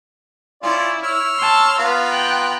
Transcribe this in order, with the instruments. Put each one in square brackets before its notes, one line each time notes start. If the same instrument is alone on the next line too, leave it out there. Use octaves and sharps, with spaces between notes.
[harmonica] C#4 F4 D5 [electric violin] E4
[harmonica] C#5 E6 F6
[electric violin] A5 C6
[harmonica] B3 F4 A#5 [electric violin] F5
[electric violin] G5 F#6